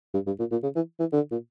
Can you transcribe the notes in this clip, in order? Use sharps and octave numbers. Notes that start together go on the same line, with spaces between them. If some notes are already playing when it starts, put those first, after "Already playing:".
G2
G2
A#2
A#2
C#3
E3
E3
D3
A#2